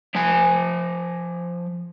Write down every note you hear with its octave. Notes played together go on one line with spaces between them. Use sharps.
F3 G#5